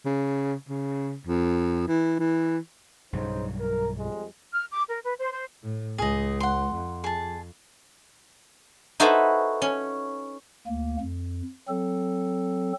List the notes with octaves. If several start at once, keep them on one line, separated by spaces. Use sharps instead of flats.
C#3
C#3
F2
E3
E3
B1 G2 C#3 F#3 D#4 C5
A#4
F2 G3 G#3
F6
D6
A#4
B4
C5
C5
A2
C#2 G#4 D#5
F#5 C6
F2
G#4 A5
D#4 E4 F#4 A4 B4 C5
C#4
D2 A#3
F2
F#3 C4 A4